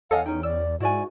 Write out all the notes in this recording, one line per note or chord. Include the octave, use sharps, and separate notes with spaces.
E2 A4 C#5 D#5 F5 F#5 G#5
C#4 D#4 G5
D5 E6
G#2 E4 F#4 D5 G#5